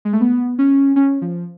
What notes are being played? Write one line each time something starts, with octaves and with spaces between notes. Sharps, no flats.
G#3
A3
B3
C#4
C#4
F3